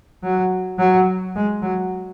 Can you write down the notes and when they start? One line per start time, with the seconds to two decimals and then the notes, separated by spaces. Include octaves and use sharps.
0.23 F#3
0.79 F#3
1.35 G#3
1.62 F#3